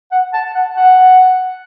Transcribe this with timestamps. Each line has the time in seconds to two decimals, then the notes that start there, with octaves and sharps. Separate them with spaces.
0.12 F#5
0.33 A5
0.55 F#5
0.77 F#5